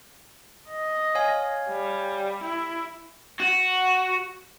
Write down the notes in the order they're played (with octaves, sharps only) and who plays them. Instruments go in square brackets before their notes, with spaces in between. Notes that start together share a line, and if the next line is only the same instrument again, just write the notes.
[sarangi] D#5
[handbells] C#5 F5 G#5
[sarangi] G3
E4
[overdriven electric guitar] F#4